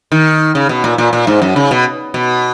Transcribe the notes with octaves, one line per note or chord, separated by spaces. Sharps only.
D#3
C#3
B2
A#2
A#2
A#2
G#2
F#2
C#3
B2
B2